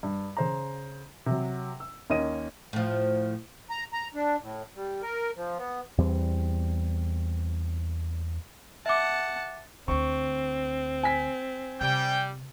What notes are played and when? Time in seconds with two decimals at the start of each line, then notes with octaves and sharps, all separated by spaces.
0.03 G2
0.37 C#3 C5 A#5
1.26 C3 F#3
1.80 E6
2.10 D#2 A#3 C#4 D#5 D#7
2.73 A2 F3
3.70 A#5
3.93 A#5
4.15 D4
4.42 A2
4.75 G3
5.02 A#4
5.36 F3
5.58 B3
5.98 E2 G3 C4
8.86 E5 F#5 A5 D6
9.88 D2 D3 C4 C#6
11.03 G#5 B6
11.81 C3 G3 G5